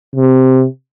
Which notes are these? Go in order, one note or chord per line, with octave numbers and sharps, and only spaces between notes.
C3